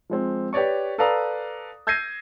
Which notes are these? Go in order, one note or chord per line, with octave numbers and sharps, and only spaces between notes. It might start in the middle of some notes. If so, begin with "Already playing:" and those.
F3 G#3 C4
G4 B4 C#5 D5 C#6
A4 B4 D5 F5 A#5 D#6
E6 G6 G#6 A#6 C7 D#7